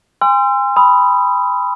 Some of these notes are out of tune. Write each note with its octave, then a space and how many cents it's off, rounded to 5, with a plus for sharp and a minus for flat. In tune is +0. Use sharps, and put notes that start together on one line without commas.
G#5 -40 C6 -20 E6 +40
B5 +0 D#6 +20